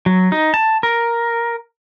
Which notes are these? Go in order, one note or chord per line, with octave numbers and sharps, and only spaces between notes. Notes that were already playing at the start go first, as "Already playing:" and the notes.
F#3
D#4
A5
A#4